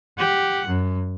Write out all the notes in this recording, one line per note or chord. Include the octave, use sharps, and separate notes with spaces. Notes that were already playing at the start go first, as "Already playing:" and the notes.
G4 F#5
F#2